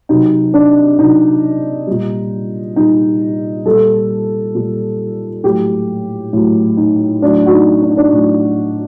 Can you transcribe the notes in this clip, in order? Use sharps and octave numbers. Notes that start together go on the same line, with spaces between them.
C3 F#3 D#4
D4
C3 F#3 D#4
A#2 G3
A#2 G3 D#4
A#2 G3 A4
A#2 G3
A2 F#3 G4
A2 F#3
D#4
A2 F#3 D4
F#4
D#4
D4
D#4
D4
A2 F#3